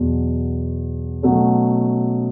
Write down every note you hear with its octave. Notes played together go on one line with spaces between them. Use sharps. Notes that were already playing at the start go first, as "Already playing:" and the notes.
Already playing: E2 B2 F#3
B2 F#3 A3 C#4